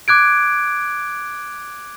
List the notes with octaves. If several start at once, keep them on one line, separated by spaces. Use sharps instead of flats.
D6 F#6 G#6 D7